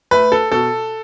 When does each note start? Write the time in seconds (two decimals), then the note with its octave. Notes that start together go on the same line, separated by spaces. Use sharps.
0.11 A3 B4
0.32 A4
0.52 B2 A4